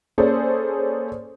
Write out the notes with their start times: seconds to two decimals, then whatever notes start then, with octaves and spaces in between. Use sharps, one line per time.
0.18 A#3 C#4 G#4 A4 C5 D5